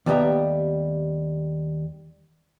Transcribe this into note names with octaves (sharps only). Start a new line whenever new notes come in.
D#2 G3 A3 B3 E5 A#5